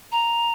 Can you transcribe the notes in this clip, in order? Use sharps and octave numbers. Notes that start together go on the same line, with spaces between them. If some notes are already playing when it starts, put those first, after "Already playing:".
A#5